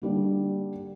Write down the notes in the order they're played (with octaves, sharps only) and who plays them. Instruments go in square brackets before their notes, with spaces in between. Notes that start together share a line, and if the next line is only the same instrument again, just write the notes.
[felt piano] D3 G3 A#3